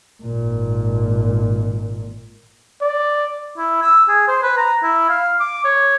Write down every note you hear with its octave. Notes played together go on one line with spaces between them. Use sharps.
G#1 A#2
D5
E4
E6
G#4
C5
B4
A#5
E4
F5
D6
C#5